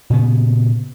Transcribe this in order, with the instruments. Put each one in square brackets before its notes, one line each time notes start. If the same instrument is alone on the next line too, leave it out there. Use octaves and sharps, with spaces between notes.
[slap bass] A#2 C#3 B3